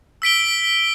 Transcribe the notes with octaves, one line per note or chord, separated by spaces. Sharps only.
E6 B6 D7 G7